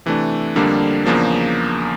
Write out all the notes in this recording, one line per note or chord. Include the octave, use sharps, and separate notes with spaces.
C3 E3 A3 D4
F2 D3 G3 A#3 D4
E2 C#3 F3 A#3 D4